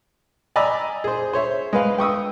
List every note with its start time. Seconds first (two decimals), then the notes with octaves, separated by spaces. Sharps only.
0.56 D5 D#5 G#5 A#5 B5 E6
1.04 G#4 C5
1.33 C5 C#5 E5
1.73 G#3 B4 F5
1.98 G5 C#6 D#6 E6